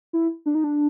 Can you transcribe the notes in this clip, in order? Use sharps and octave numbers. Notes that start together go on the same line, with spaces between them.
E4
D4
D#4
D4